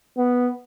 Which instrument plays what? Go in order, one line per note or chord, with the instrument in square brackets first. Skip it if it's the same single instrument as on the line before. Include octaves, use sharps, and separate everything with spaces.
[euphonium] B3